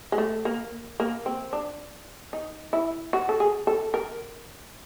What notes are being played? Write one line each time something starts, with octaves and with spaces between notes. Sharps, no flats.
G#3
A3
A#3
A#3
C4
D4
D#4
E4
F#4
A4
G#4
A4
A#4